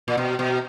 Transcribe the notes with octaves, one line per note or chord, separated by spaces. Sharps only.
A#2
B2
B2